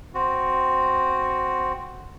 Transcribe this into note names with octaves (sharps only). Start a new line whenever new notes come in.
C4 F#4